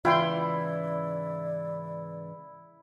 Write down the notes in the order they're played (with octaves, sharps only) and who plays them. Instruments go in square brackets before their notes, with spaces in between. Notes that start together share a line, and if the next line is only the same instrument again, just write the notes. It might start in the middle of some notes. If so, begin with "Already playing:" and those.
[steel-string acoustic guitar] G#2 C#3 E3 [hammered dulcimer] E4 [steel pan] F4 G5 C6 [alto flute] D5